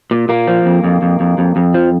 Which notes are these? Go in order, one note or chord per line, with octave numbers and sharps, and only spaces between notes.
A#2
A#2 A#3
F3
F2
F2
F2
F2
F2
F2
F3